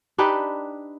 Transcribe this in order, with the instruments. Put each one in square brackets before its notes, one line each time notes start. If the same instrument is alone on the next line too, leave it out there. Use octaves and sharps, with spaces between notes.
[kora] D4 D#4 G4 B4